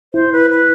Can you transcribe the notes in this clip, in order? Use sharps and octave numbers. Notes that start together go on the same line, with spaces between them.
E4 C5
B4
B4